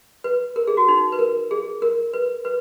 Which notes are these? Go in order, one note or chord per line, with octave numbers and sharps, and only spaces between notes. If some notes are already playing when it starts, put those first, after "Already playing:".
B4
A#4
G#4
F#4
D#4
B4
A#4
G#4
A#4
B4
B4